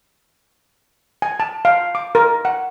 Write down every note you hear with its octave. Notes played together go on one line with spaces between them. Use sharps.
G#5
A5
F5
D6
A#4
F#5